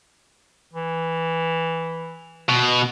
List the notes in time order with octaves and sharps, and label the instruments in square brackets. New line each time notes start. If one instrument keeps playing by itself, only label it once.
[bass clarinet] E3
[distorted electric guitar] B2